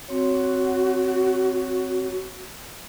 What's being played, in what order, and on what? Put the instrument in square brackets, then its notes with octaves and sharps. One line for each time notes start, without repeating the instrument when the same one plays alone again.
[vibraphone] C4 C#5 [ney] F#4